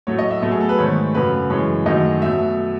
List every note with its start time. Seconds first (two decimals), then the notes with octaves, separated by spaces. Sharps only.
0.07 A2 F#3 A3 C#5
0.19 D#5
0.31 E5
0.42 B2 F#3 A3 A4
0.52 G#4
0.61 A4
0.69 B4
0.78 G#2 D#3 A3 C#5
1.14 F#2 C#3 F#3 A3 B4
1.50 F#2 E3 G#3 C#5
1.86 F#2 D#3 F#3 A3 D#5
2.22 B2 F#3 A3 E5